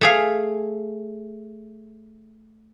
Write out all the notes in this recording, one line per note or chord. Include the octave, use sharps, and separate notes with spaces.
A3 G#4 F5